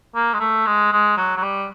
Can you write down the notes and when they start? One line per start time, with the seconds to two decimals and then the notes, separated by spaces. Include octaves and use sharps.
0.15 A#3
0.33 G#3
0.40 A3
0.66 G#3
0.92 G#3
1.17 F#3
1.36 F#3
1.42 G3